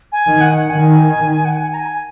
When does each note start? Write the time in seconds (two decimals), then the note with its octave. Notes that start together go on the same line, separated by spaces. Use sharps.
0.12 G#5
0.26 D#3
0.41 F#5
0.70 D#3 G#5
1.45 F#5
1.57 G#5
1.74 A#5
1.78 G#5